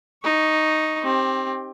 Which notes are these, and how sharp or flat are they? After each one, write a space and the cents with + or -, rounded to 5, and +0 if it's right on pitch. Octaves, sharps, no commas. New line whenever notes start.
D#4 +0 C#6 +0
C4 +20 G4 +0